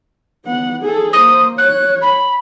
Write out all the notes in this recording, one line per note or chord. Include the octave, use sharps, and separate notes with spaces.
B3 F#5
G#4 A4
A#3 C5 D#6
C#5 F#6
B5